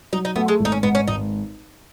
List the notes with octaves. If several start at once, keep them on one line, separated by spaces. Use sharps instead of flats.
F#3 D#4
D#4
A3 B3
G#3
G#1
D#4
C#4
G#2 B3
C#4
G#1 D#4